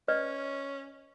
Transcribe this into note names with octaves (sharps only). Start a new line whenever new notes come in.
C#4 B4 D5 D#5